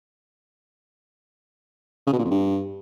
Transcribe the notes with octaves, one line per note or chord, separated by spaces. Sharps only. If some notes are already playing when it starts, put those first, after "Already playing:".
C#3
B2
A#2
F2
G2